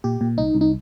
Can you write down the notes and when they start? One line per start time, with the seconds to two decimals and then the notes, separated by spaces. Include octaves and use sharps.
0.04 A#2 G4
0.21 A#2
0.38 C2 D#4
0.55 C2
0.61 D#4